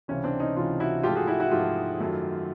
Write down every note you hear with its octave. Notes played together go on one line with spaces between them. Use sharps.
C#2 C3 E3 C#4
C4 D4
C#4 D#4
C#2 C3 E3 D#4 F4
E4 F#4
G#2 F3 A3 F4 G4
F#4 G#4
E4 F#4
E4 F#4
G#2 F3 A3 F4 G4
F#2 D#3 F#3 A3